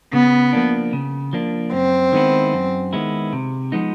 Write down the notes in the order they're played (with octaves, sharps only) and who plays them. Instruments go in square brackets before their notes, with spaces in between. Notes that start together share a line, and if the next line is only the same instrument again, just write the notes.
[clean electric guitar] C#3 [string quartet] B3
[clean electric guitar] F3 A#3 D4
C#3
F3 A#3 D4
[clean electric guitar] F#2 [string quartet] C4
[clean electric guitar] D#3 G#3 B3 E4
F#2
D#3 G#3 B3 E4
C3
F3 G#3 B3 D#4